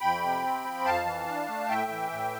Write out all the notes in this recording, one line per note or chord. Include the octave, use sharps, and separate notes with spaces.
F2 G5 B5
C3
C4
F3
F2 F5 A5
E3
D4
A3
A2 E5 G5
E3
A2